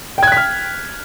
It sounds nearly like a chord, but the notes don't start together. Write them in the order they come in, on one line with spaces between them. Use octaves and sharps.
G5 G#6 F#6 B6 F6